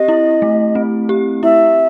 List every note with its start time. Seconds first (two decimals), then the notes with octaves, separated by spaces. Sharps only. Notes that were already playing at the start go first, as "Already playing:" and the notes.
Already playing: C4 G4 D#5
0.08 E4
0.42 A3
0.75 C4
1.09 G4
1.43 E4 E5